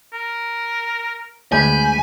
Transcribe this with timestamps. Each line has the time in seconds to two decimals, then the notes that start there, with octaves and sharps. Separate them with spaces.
0.13 A#4
1.52 D2 G#3 B4 G#5 B5 G6